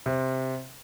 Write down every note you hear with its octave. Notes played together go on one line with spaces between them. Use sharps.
C3